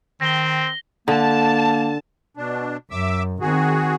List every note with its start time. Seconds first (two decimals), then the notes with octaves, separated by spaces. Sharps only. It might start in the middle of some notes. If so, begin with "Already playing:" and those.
0.21 D#3 C4 A#6 G7
1.08 D3 A#3 A5
2.37 B2 D4
2.91 F#2 E5 D6 E6
3.41 D#3 C4 F#4 G#4